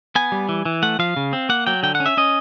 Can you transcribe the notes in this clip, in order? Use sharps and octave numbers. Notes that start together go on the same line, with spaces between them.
B3 G#5
G3
E3
E3
A3 F#5
F3 F5
C#3
C4
A#3 F#5
F#3 G5
D3 G5
F#5
C#4
E5
C#4 D#5